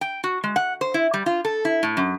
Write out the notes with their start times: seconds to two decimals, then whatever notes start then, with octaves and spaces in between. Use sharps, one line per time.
0.01 G5
0.24 F#4
0.44 G#3
0.56 F#5
0.81 C5
0.94 E4
1.14 G3
1.26 F4
1.45 A4
1.65 E4
1.83 A2
1.97 F#2